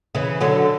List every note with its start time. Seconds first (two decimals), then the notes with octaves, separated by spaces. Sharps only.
0.15 C#3 E3
0.41 D3 F#3